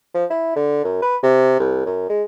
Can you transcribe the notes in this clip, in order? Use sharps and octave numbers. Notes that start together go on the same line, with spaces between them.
F3
E4
D3
F#2
B4
C3
C2
F#2
G#3